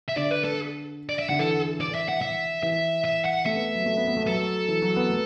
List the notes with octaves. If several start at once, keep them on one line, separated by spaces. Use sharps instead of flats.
E5
D3 D5
B4
A4
D5
E5
D3 F#5
E3 A4
D5
E5
F#5
E5
E3 E5
E5
F#5
A3 E5
B3
F#3
A3
B3
B3
A3
F#3 A4
E3
F#3
B3
A3